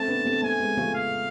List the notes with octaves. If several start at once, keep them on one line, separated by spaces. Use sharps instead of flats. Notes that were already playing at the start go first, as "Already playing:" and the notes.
Already playing: A3 C4 A5
B3 D4
A3 C4
A3 C4 G#5
G#3 B3
F3 A3
F5